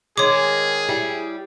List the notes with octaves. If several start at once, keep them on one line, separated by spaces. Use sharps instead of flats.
D#3 G#3 G#4 C#5 D6
G3 E4